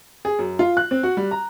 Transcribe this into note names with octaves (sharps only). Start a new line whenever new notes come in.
G#4
F#2
F4
F#6
C4
F#4
G3
A#5